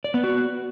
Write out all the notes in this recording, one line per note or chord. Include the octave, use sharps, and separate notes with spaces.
D5
B3
F#4